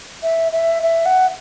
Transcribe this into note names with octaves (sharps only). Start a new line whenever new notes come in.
E5
E5
E5
F#5